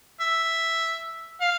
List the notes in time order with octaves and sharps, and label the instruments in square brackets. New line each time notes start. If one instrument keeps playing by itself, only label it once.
[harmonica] E5
F5